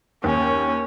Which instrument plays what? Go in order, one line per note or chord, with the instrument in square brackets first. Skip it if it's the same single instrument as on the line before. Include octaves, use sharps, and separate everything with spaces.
[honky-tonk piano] D#2 [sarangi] C#4